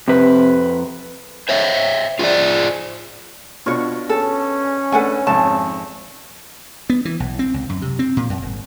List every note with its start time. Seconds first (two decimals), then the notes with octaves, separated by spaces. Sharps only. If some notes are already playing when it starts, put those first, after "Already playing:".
0.08 F2 C3 B4
1.49 C5 C#5 E5
2.19 F4 G#4 A4 C5 D5
3.66 B2 D4 F4 F#4 C#5
4.09 C#4 A4
4.92 A3 D4 A4 B4 F#5 G#5
5.27 G#1 F2 A5
6.90 B3
7.05 E3
7.20 B1
7.39 C4
7.54 C#2
7.69 F#2
7.82 C3
7.99 C4
8.17 A#2
8.30 F#2
8.42 G#1